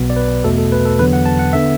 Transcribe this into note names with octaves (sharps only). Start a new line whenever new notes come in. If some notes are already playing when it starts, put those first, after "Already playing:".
Already playing: B1 B2 B3
D5
B4
E2 B2 A3 A4
A4
B4
A4
E2 D3 F#3 B3 B4
F#5
A5
F#5
D3 B3 E5